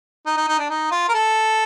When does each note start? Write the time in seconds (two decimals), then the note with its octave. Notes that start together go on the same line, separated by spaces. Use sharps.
0.26 D#4
0.37 D#4
0.48 D#4
0.59 D4
0.70 D#4
0.92 F4
1.09 A#4
1.14 A4